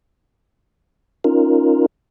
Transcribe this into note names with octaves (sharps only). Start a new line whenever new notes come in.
C#4 D#4 F4 A#4